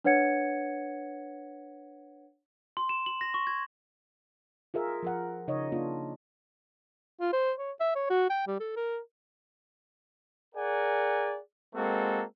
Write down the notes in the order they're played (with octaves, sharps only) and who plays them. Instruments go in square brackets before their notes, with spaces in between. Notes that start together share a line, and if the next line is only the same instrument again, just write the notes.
[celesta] D4 B4 C#5 F#5 G#6 C#7
[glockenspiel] C6
E7
F#7
A#6
C#6
G#6
[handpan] F4 G#4 A#4 E5
F3 A#4 F#5
C#3 D#4 C#5 D#5
A#3 D4 F4
[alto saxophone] F4
C5
C#5
E5
C#5
F#4
G5
G3
A4
A#4
[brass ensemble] G#4 A#4 D5 F#5 G#5
G#3 A#3 C4 F#4 A4